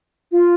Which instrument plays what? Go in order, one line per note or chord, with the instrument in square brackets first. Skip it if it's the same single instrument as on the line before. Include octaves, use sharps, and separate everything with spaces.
[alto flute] F4